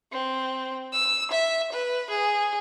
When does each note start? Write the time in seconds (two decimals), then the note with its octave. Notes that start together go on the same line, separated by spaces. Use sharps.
0.12 C4
0.93 E6
1.31 E5
1.72 B4
2.10 G#4